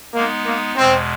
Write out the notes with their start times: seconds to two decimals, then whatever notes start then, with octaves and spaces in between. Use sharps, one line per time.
0.15 G#3 A#3 B3 D#4
0.46 A#3
0.76 E2 B2 G#3 C4